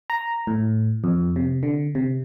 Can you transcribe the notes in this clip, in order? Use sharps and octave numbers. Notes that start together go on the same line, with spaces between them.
A#5
A2
F2
C3
D3
C3